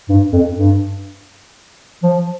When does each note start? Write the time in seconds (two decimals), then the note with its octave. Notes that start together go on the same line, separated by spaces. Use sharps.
0.09 G2
0.33 F2
0.57 G2
2.03 F3